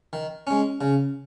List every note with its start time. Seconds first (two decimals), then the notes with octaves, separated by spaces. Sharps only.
0.13 D#3
0.47 G#3 C#4
0.81 C#3